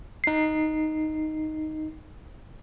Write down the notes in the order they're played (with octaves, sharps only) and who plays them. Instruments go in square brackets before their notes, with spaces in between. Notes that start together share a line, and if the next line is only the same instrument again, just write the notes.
[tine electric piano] D#4 C7